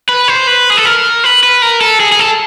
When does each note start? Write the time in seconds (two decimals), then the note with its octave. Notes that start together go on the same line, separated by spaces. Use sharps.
0.09 B4
0.28 C5
0.47 B4
0.70 G#4
0.77 A4
0.86 A#4
1.24 B4
1.43 B4
1.62 A#4
1.81 A4
2.00 G#4
2.12 G#4
2.19 A4